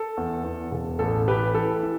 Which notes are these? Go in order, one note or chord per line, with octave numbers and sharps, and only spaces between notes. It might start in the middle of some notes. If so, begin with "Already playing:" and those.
Already playing: A4
E2
E2
E1
A1 A4
E3 G4 B4
E3 A4
E3